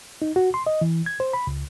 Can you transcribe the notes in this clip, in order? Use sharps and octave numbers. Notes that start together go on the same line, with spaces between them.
D#4
F#4
C6
D#5
E3
G#6
C5
B5
C#2